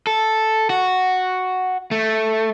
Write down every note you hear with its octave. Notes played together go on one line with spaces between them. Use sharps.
A4
F#4
A3